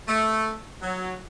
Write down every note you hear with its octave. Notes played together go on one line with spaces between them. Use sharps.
A3
F#3